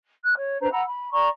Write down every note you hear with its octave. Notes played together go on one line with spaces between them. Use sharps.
F#6
C#5
D4 B4 C5 A#5
F#5 A#5 B5 E6
B5
D5 A#5 C#6